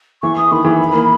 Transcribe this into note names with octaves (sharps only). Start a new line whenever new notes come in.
E3 C#6
D#6
D#3 B5
E3
A#3